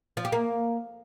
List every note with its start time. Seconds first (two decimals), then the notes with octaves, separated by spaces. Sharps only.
0.17 F3
0.25 G4
0.32 A#3